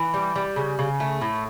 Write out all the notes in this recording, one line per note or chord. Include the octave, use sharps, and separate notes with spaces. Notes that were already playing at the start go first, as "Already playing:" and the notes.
Already playing: E3
G3
G3
C#3
C#3
A3
A2